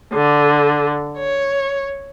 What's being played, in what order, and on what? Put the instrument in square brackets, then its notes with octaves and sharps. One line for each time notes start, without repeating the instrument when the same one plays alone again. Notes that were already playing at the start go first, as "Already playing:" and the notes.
[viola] D3
C#5